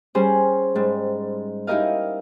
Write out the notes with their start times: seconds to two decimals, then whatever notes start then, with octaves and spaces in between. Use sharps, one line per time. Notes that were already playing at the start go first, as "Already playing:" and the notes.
0.15 G3 C#4 G#4 C5
0.75 G#2 G3
1.67 D#4 E4 G4 A#4 D#5 F5